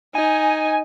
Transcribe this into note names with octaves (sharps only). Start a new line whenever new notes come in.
D#4 G#5